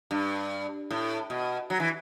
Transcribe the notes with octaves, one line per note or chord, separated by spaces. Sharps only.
G2
A2
B2
F#3
E3